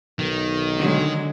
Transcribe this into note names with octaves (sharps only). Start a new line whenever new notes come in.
B1 D#3
D3 F#3 G#3